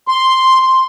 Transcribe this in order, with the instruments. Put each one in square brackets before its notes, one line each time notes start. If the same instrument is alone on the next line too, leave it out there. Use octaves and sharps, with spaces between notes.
[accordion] C6